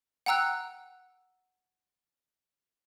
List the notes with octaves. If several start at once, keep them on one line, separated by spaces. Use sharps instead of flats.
F#5 G5 A#5 E6 F#6